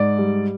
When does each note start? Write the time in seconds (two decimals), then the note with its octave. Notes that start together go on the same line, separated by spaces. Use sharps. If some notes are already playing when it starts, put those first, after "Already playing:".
Already playing: G#2 D5
0.19 G3